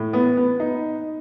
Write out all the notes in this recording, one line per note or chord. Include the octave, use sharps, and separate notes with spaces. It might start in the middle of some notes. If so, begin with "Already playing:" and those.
Already playing: A2
B3
B3
D#4